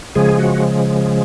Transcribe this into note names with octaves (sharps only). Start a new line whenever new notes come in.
C#3 F3 G#3 G#4
F#4